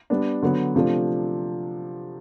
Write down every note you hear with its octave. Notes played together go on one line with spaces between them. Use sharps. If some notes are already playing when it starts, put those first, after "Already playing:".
G3 B3 D4
D3 F#3 B3
C3 F3 A3 D4